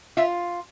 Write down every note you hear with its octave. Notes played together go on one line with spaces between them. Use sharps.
F4 E5